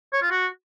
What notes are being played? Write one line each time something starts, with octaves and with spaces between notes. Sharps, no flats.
C#5
F4
F#4